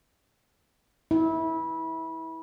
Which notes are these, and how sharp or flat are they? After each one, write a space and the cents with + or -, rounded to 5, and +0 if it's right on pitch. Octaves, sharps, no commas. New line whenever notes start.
E4 -25